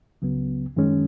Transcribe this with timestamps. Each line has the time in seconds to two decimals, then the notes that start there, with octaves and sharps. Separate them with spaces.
0.22 C#2 C#3 F#3 B3
0.76 F#2 D#3 G#3 C#4